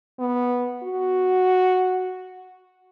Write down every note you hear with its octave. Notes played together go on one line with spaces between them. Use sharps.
B3
F#4